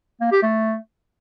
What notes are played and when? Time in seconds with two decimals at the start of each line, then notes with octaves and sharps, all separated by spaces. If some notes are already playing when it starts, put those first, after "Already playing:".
0.21 A#3
0.32 G4
0.43 A3